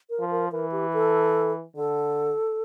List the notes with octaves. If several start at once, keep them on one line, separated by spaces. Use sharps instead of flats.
A#4
F3
A#4
E3 A#4
G4
A4
D3 A4